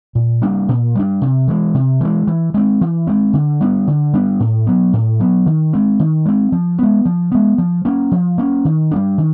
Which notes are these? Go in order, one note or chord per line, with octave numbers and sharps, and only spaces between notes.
A#2
G3 A#3 D4
A#2
G3 A#3 D4
C3
E3 G#3
C3
E3 G#3
E3
G#3 C4
E3
G#3 C4
D3
G3 B3 D4
D3
G3 B3 D4
A2
F#3 B3
A2
F#3 B3
D#3
G#3 C4
D#3
G#3 C4
F3
G#3 B3
F3
G#3 B3
F3
A#3 C#4
F3
A#3 C#4
D#3
G3 B3 D4
D#3